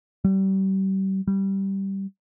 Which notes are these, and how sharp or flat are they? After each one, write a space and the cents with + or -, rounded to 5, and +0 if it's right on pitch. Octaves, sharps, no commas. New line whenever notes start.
G3 -35
G3 -10